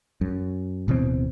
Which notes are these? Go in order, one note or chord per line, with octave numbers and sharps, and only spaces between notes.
F#2
D1 B2 E3 C4